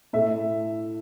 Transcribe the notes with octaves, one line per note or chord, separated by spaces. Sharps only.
A2 A3 E5